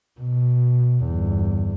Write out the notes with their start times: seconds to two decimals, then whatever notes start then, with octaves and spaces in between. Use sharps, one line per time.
0.21 B2
1.05 G1 E2